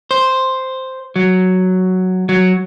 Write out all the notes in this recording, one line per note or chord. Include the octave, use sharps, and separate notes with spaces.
C5
F#3
F#3